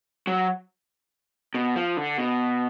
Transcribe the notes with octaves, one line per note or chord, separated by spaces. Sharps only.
F#3
B2
F3
D3
B2